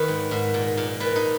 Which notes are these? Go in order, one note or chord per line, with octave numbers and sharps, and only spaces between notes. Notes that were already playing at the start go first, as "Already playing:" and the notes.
Already playing: D#3 B4 C#5
G#2
G#2
A#2
A#2
A#2 B4
D#4